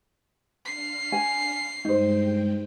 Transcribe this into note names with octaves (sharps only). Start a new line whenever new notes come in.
D4 F5 C7
G#5
G2 G#3 D#4 C5 G5